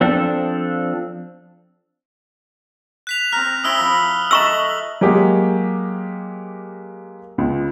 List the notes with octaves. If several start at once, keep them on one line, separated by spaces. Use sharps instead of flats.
F3 C4 D4 A4
F#6 B6 F7
C4 A#5 F6
C4 E4 D#6 E6 G7
F3 B5
A4 D#5 E5 A#5 C#6 E6 F#7
F#3 G#3 A#3 G4
C#2